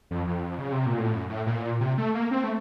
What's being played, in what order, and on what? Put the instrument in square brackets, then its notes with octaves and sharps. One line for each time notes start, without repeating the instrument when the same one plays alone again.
[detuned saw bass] F2
F2
C#3
C3
A#2
A2
F#2
A2
A#2
C3
A3
A#3
C4
A3